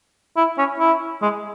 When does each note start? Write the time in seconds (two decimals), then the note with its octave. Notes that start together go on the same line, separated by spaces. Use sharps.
0.37 E4
0.58 C#4
0.79 E4
1.22 G#3